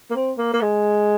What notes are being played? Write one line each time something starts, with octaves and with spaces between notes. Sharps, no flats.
A#3
C4
A#3
A#3
G#3